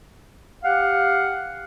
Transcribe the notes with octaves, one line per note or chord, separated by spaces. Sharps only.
G4 F5 F#5